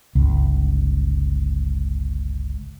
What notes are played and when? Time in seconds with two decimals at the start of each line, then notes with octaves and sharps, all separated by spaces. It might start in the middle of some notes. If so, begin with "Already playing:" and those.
0.15 G1 C#2